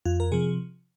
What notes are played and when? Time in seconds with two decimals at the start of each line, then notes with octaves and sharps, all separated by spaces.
0.05 F2 F4
0.20 A#4
0.32 C3 F3 G#4